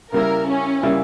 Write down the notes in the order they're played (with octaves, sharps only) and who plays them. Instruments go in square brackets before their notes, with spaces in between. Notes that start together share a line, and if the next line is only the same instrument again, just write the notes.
[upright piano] C#3 G3 A#3 E4 [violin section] A#4
[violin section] C#4
[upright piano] C#3 G3 A#3 E4